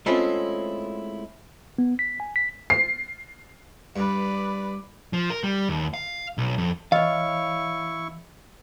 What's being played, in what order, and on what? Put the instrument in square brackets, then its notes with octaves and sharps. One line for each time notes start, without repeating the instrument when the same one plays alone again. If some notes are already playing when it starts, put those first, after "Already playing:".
[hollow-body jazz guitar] G#3 A3 C4 C#4 E4 F4
[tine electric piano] B3
B6
G#5
B6
[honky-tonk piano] C7
[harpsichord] G2 [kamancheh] B4 D5
[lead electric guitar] F3
A#4
G3
D#2
F5
B1
F2
[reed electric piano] E3 [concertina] E4 C#6 [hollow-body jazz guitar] C#5 F5 [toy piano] D#5